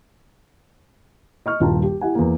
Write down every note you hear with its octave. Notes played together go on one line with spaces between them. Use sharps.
D#5 C#6 F6
D#1 G2 F4 G5 A5 A#5
G4
E4 G4 F#5 G#5
E2 A#3